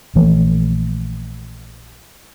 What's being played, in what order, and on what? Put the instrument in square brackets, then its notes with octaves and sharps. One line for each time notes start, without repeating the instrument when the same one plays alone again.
[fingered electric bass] A#1 E3 A3